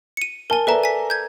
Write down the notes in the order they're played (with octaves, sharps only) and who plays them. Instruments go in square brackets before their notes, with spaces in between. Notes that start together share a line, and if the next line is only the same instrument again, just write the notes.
[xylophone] C#7 D#7
[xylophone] A#4 G#5 [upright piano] A5 G7
[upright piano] A4 D5 A#5 [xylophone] B4 E5 A5
[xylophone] G#5 B6
G6 G#6